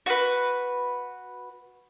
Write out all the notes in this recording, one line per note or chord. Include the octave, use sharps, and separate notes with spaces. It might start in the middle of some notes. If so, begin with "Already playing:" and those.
F#4 B4